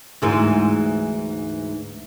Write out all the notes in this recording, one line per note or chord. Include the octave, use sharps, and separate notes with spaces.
D2 G#2 E3